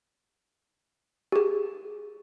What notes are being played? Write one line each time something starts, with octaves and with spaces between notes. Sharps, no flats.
G4 G#4